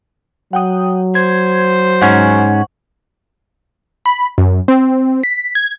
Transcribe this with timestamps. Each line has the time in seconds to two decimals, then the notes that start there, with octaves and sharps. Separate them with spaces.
0.53 F#3 F#5 G5 D#6
1.15 C5 G#6
2.02 G#2 C#4 F#5 C#6
4.06 B5
4.38 F#2
4.68 C4
5.24 B6
5.55 G#6